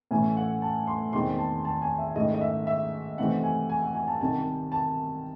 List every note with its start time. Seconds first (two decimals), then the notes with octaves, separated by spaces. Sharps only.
0.11 A2 E3 A3 C#4 E4 G#5
0.37 F#5
0.62 A5
0.87 C6
1.13 E2 D#3 G#3 C4 C6
1.39 A5
1.65 A5
1.82 G#5
1.98 E5
2.15 G#2 D#3 A3 C#4 E4 D#5
2.34 D#5
2.41 E5
2.67 E5
3.18 C3 E3 A3 C4 D#4 F#5
3.43 G#5
3.70 G#5
3.82 F#5
3.95 G#5
4.08 A5
4.20 C2 C3 D#3 A5
4.72 A5